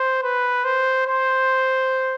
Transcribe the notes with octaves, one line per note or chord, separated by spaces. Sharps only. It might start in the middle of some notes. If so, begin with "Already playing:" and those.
Already playing: C5
B4
C5
C5